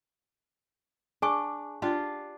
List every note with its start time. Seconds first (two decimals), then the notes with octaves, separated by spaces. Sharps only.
1.22 D4 G#4 G#5 C#6
1.82 D4 F4 G4